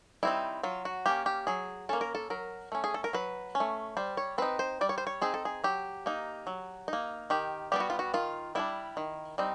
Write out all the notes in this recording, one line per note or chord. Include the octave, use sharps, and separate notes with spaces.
G3 C4 D#4 E4
F#3 F4
F#4
A#3 C#4 G4
G4
F#3 G#4
A#3 C#4 A4
A#4
A4
F#3 A#4
A3 C#4
G#4
A4
A#4
F#3 B4
C#4
A3
G3 C5
C#5
C4 D#4 B4
C5
G3 D5
C#5
C5
C#5
C4 D#4 G#4
A4
G#4
F#3 G4
A#3 D#4
F#3
A#3 D#4
D#3 G4
G3 B3 D4 G4
F#4
F4
F#4
D#3 F4
G3 B3 D4 E4
D#3
G3 C4 D#4